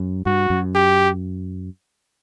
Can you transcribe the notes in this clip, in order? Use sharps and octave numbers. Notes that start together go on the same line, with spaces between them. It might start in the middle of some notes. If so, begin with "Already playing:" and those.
Already playing: F#2
G2 F#4
F#2
G4